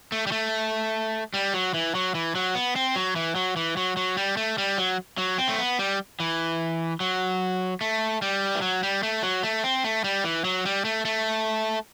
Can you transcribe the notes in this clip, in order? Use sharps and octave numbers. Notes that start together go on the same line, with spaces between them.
A3
G3
A3
G3
F#3
E3
F#3
E3
F#3
B3
C4
F#3
E3
F#3
E3
F#3
F#3
G3
A3
G3
F#3
F#3
C4
A3
B3
G3
E3
F#3
A3
G3
E3
F#3
G3
A3
F#3
A3
C4
A3
G3
E3
F#3
G3
A3
A3